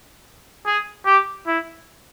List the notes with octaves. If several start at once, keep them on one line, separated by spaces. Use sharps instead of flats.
G#4
G4
E4